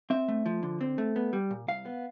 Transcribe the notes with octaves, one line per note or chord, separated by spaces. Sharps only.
C4 E5
A3
F3
D3
C4
A3
B3
G3
A#2
C2 F5
B3